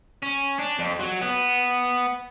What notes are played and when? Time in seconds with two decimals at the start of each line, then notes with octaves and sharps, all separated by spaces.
0.23 C#4
0.59 D4
0.79 F2
1.00 F#3
1.22 B3